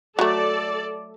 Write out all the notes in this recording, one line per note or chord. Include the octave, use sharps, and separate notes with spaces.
F#3 A3 A4 D5